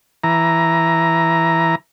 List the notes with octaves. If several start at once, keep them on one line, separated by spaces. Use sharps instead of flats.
E3 A#5